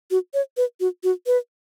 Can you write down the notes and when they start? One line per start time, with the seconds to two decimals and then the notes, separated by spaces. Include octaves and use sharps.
0.11 F#4
0.34 C#5
0.57 B4
0.80 F#4
1.03 F#4
1.26 B4